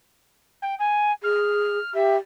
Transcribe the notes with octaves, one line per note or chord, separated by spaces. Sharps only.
G5
G#5
G#4 F6
G4 E5